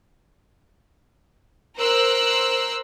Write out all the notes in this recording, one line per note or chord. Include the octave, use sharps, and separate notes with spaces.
A#4 C5 E6 F#6